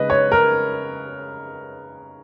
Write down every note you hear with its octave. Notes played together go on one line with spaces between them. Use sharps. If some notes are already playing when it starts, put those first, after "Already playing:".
Already playing: C#3 G#3 C#4 B4 D#5
C#5
A#4